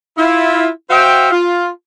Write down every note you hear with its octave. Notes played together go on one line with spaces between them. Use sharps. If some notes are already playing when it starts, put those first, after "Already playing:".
E4 F4
F#4 C5 E5 F5 G5
F4